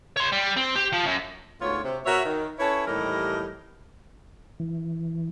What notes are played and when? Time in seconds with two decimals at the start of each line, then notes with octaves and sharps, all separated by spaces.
0.17 C#5 C6
0.32 G3
0.57 C4
0.76 G4
0.93 F3
1.06 F#2
1.61 D2 G#2 B3 F4 C#5
1.84 C3
2.06 B2 F#4 A#4 C#5 E5
2.25 D#3
2.59 C#4 E4 A4 B4 C#5
2.87 D#2 A2 E3 G3 A#4 D#5
4.60 E3